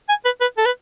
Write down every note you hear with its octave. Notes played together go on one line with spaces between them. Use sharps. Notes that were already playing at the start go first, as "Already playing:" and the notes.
G#5
B4
B4
A4
B4